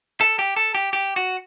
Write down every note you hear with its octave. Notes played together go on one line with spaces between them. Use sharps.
A4
G4
A4
G4
G4
F#4